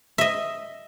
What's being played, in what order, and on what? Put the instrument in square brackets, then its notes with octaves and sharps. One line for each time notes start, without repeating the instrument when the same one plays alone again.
[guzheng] D#5 E5